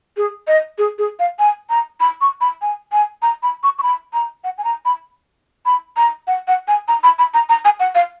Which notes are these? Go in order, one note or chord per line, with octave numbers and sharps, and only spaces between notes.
G#4
D#5
G#4
G#4
F5
G#5
A#5
B5
C#6
B5
G#5
G#5
A#5
B5
C#6
C#6
B5
A#5
F#5
G#5
A#5
B5
B5
A#5
F#5
F#5
G#5
A#5
B5
B5
A#5
A#5
G#5
F#5
F5